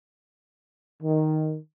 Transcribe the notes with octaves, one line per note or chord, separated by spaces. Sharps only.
D#3